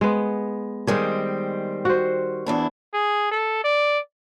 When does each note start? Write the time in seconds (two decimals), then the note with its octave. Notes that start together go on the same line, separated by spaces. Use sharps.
0.01 G#3 B3
0.87 D#3 G3 G#3 C4 G#4
1.85 F#4 C5
2.46 E2 D4 E4
2.94 G#4
3.31 A4
3.64 D5